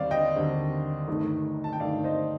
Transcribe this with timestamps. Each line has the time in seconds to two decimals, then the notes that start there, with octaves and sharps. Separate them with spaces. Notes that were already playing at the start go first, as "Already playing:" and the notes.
Already playing: D#2 D3 G3 C4 C5 D5 F5
0.11 D#5 G5
0.35 D#2 D3 G3 C4
1.08 G1 G2 D#3 A3 D#4
1.64 A5
1.73 G5
1.80 G1 G2 D#3 A3 D#4 D5 F5
2.04 C5 D#5